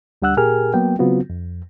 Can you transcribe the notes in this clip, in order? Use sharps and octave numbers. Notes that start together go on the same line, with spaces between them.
D2 G3 D4 F#5 E6 F#6
A#2 G4 G#4 A#4 G#5 F6
F#3 A#3 B3 G5
C#3 F#3 B3 C4 F4 F#4
F2